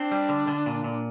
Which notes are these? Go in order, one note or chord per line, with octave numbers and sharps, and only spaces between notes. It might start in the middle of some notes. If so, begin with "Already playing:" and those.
Already playing: C4 D4
G3
D3
D3
A#2
A#2